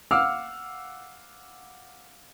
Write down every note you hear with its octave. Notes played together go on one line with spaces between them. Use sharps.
F5 F#5 D6 E6 F6